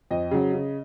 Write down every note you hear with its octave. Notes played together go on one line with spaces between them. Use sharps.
F2 D#5
C#3 F#3
C#3